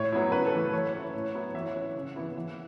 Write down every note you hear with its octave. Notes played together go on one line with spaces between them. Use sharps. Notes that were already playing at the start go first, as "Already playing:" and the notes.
Already playing: A2 C#5
F#3 B3 E4
C#3 B4
A4
E3 A3
E3 C#5
C#4 E4
A2
F#3 B3 E4
E3 E5
C#5
E5
C#4 E4
C#3
E3 B3 E4
E3